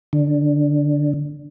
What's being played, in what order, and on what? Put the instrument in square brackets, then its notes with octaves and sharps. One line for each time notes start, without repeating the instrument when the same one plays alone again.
[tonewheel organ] D3